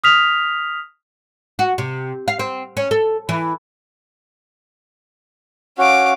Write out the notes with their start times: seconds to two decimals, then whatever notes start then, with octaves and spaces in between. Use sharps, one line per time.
0.04 D#6 F6 B6 F7
1.59 F#4
1.78 C3
2.28 F5
2.39 C4
2.77 C#4
2.91 A4
3.29 E3
5.78 C#4 F#4 F5 D6